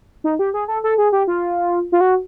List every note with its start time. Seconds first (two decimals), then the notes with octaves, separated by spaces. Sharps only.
0.24 D#4
0.39 G4
0.54 G#4
0.68 A4
0.84 A4
0.98 G#4
1.12 G4
1.28 F4
1.92 F4
2.01 F#4